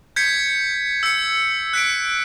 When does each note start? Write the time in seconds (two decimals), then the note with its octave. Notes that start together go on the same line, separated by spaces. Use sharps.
0.16 G6 G#6 B6 C#7
1.03 E6 G#6 C#7
1.73 F#6 B6 D7